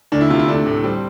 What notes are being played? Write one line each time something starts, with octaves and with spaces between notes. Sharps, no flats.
D2 D4
E4
C3 F4
E4
A3 D4
A2
G3 C4